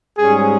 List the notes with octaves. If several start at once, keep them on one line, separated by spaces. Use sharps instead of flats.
G#2 G3 C#4 G#4